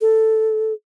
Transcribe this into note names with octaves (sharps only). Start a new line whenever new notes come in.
A4